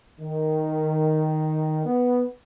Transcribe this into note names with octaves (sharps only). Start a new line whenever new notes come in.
D#3
B3